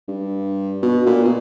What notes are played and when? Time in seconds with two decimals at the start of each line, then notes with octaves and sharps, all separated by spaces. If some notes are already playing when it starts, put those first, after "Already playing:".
0.08 G2
0.82 B2
1.06 A#2
1.25 B2